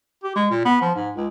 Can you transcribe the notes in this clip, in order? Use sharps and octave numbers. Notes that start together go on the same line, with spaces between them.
G4
G#3
A#2
B3
F3
G#2
C#2